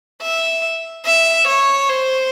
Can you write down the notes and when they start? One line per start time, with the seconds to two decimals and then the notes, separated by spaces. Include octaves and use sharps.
0.22 E5
1.05 E5
1.47 C#5
1.89 C5